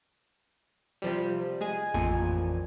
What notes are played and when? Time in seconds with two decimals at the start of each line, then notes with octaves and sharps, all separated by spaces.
1.02 C3 F3 G3
1.61 G#3 G#4 G#5
1.94 A1 F2 A#2 G#5